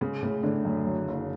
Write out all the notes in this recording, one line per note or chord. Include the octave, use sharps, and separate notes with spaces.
C#3 G#3
A2 C#3
A2 D3
F#2
F#3
F#1